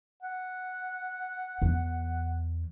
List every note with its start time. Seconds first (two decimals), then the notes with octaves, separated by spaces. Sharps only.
0.23 F#5
1.62 E2